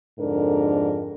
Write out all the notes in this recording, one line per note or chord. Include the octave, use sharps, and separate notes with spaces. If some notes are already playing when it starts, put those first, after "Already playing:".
F2 G#2 D3 D4 A4 A#4